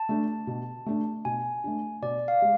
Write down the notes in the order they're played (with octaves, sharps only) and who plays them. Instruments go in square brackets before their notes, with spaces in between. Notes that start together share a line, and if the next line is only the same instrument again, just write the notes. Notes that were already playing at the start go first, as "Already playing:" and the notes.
Already playing: [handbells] A5
[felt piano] A3 D4
B2
A3 D4
[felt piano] B2 [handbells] G#5
[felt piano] A3 D4
[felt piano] B2 [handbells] D5
[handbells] F5
[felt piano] G#3